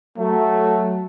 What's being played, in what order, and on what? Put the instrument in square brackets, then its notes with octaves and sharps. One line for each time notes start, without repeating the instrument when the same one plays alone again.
[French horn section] F#3 [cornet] A3